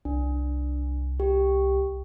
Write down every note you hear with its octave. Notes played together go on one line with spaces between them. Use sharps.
C2 D4
G4